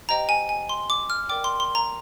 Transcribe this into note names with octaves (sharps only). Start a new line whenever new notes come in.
G4 C5 D#5 G5 A#5
G#5
G#5
C6
D6
F6
A#4 D5 G5 D6
C6
C6
A#5